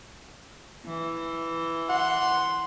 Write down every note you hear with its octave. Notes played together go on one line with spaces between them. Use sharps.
E3
F#5 C6